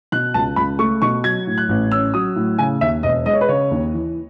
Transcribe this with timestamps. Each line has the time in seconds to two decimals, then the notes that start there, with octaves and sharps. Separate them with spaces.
0.12 B2 F#6
0.34 C#2 A5
0.56 C#2 B5
0.79 A3 C#6
1.02 B2 C#6
1.24 F#3 G#6
1.47 A2
1.58 F#6
1.69 A1
1.91 C#4 E6
2.14 F#3 D#6
2.36 A2
2.58 C#3 G#5
2.81 D#2 E5
3.03 E1 D#5
3.26 G#3 D#5
3.34 C#5
3.41 B4
3.48 C#3 C#5
3.71 D#2
3.93 E3